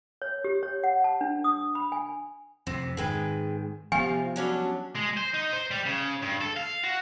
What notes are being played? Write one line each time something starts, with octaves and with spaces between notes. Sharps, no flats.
C#5
G4
C#5
F#5
A5
D4
D#6
B5
G#5
F2 C3 C4
G#2 D#3 G#4 B4 G5
C3 F3 B3 F4 F5 G#5
F#3 G3 C#4 D4
G#3
C5
D#4
C5
G3
C#3
G2
A4
F5
F#4